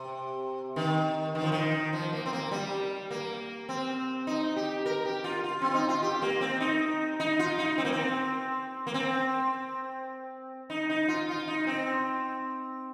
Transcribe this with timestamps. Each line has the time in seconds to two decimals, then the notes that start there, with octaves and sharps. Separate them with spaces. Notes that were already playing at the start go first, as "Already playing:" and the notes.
Already playing: C3
0.76 D#3
1.35 D#3
1.44 F3
1.52 D#3
1.93 F3
2.13 A#3
2.26 C4
2.33 A#3
2.51 G3
3.11 A#3
3.69 C4
4.27 D#4
4.56 G4
4.86 A#4
5.05 G4
5.24 F4
5.44 F4
5.62 C4
5.74 D#4
5.89 F4
6.03 G4
6.22 A#3
6.41 C4
6.60 D#4
7.20 D#4
7.39 F4
7.59 D#4
7.78 C4
7.85 A#3
7.92 C4
8.87 A#3
8.94 C4
10.70 D#4
10.90 D#4
11.08 F4
11.29 F4
11.48 D#4
11.67 C4